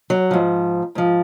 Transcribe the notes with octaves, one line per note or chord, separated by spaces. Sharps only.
F#3
G#2 F3
G#2 F3